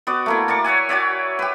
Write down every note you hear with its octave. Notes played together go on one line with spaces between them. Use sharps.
B3 F#4 D5
A3 A#3 E4
A#4 D5 A5 C#6
C#5 E5 F#5 G#5
F#4 C#5 D5 E5
G4 B4